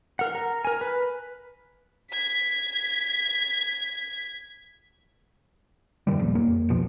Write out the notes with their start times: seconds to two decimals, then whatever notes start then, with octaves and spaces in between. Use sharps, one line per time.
0.19 A#4 F#5
0.35 A#4
0.65 A#4 G#5
0.81 B4
2.11 G#6 B6
6.07 F#2 D#3 E3 G3
6.19 D#1 A#1 F2 A#2
6.35 F#1 F2 A#3
6.69 D1 C2 B2 F3